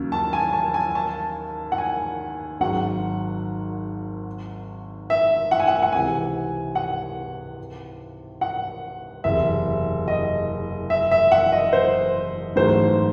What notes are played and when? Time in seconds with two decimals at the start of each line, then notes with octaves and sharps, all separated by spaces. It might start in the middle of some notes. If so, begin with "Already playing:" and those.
Already playing: D#2 C#3 F#3
0.12 A5
0.33 G#5
0.53 A5
0.74 G#5
0.95 A5
1.72 F#5
1.78 G#5
2.60 G#1 G#2 F#3 F#5
5.10 E5
5.51 F#5
5.60 G#5
5.67 F#5
5.82 F#5
5.92 C#2 C3 E3 G#5
6.75 F#5
8.41 F#5
9.24 F#1 E2 C3 E5
10.08 D#5
10.90 E5
11.11 E5
11.32 F#5
11.52 D#5
11.73 C5
12.56 A1 G#2 F#3 A3 C5